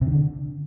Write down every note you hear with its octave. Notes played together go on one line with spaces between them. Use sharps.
C3
D#3
D3